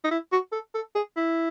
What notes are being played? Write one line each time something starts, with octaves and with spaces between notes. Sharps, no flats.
D#4
E4
F#4
A4
A4
G#4
E4